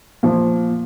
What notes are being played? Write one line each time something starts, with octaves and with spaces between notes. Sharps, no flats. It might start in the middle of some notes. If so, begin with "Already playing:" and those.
A#2 F3